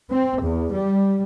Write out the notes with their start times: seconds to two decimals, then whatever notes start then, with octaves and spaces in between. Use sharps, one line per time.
0.11 C4
0.43 E2
0.75 G3